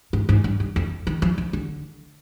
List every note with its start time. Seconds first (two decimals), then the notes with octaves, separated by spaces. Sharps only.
0.13 G#2
0.29 G#2
0.44 G2
0.60 G2
0.76 F2
1.07 D#3
1.22 F3
1.38 D#3
1.53 D3